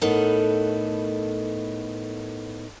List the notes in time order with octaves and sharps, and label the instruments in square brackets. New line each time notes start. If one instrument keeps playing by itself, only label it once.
[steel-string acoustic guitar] A2 B3 D#4 A4 A#4 F#5